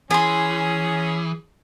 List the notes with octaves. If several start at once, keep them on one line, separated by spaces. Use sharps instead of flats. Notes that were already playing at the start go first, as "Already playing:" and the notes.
E3 C#4 G#4 G#5 C6